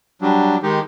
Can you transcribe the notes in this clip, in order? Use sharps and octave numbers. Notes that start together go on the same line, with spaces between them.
F#3 G3 D4
D#3 G#3 D#4 G4